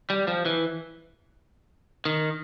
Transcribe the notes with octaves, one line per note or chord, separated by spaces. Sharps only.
G3
F3
E3
D#3